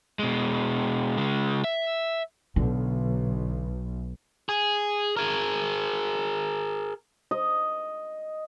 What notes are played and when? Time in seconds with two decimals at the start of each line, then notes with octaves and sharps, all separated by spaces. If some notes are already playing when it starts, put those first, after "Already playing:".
0.19 B2 G#3
1.18 C#3 G#3
1.64 E5
2.56 B1 D3
4.49 G#4
5.17 G#4 A#4
7.31 D#5